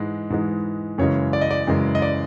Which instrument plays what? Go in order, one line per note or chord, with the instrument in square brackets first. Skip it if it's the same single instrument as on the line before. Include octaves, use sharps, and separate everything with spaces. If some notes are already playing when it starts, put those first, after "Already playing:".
Already playing: [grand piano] G#2 E3 G#3
G#2 E3 G#3
F#2 C#3 E3 G#3 C#5
D5
D#5
D5
F#2 C#3 E3 G#3
D#5
D5